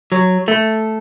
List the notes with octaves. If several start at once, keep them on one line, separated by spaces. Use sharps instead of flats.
F#3
A3